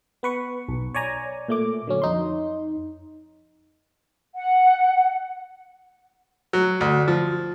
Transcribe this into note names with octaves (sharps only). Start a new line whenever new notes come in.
B3 B4 C#6
B1
C#5 D5 G#5 A#5
A#2 A3 D6
D3 F#3 C#4
F2 D#4 C6
F#5
F#3
D2
F3